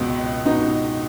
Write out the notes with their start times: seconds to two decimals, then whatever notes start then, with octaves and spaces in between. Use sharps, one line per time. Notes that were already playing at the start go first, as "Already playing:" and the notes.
Already playing: C#2 B2
0.45 B2 D#4